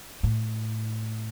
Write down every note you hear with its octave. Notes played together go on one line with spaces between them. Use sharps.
A2